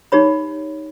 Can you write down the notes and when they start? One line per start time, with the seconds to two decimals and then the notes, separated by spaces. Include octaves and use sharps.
0.12 D#4 G4 C#5 B5